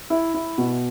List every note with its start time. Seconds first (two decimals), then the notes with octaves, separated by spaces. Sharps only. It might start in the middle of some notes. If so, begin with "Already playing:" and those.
0.10 E4
0.34 E4
0.58 B2